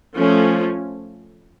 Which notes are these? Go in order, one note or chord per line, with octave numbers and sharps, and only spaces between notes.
F3 A3 C#4